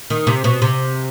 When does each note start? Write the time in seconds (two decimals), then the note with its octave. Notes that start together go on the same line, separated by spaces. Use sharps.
0.10 D#3
0.27 C3
0.44 B2
0.62 C3